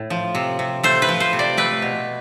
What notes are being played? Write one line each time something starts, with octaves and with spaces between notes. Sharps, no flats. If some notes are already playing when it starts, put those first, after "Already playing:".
Already playing: A2
F3
C3
C3
A3 C5
B4
F3
C5
C3
D5
A3 B4
B2